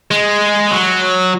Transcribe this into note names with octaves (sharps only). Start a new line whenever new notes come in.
G#3
F#3